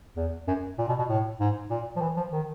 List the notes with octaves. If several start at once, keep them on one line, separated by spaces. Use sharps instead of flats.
E2
F#2
A#2
B2
B2
A2
G#2
A#2
F3
E3
F3
D#3